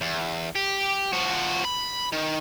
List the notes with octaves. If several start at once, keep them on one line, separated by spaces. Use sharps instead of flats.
E2
G4
F3 F#4
B5
D#3